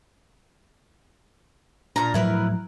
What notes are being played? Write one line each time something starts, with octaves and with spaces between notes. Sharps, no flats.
A#2 D4 A#4 A#5
A2 F3 F#3 E4 A#4 B4